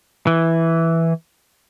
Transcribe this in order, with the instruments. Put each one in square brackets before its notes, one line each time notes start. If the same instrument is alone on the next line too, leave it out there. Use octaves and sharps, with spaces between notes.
[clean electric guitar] E3